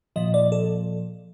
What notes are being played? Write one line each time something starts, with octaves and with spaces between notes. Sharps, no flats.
A#2 F3 D#5
D5
A4